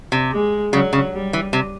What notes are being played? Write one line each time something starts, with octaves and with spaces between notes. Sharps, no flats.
C3
G#3
C#3 F#3
C#3
G3
E3
C3